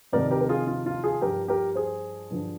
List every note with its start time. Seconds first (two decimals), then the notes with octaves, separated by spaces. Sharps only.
0.13 F2 C3 D#3 A#4 D5
0.31 G4 A#4
0.41 A#4
0.49 F4 G#4
0.67 F4
0.86 F4
1.04 F4 G#4
1.22 G2 F3 G4 A#4
1.48 G4 A#4
1.75 G#4 C5
2.30 G2 D3 F3